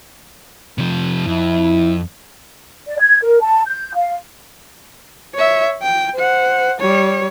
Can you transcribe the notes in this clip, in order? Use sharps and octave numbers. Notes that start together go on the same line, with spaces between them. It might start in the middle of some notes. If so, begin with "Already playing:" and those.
C3 F3
F2 E4
D5
G#6
A#4
A5
G6
F5
C#5 E5
G5
C5 F#5
G3 C#5